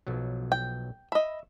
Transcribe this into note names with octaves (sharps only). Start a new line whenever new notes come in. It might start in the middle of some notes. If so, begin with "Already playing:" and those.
B1 F3 F#3
G5
D#5 E5 B5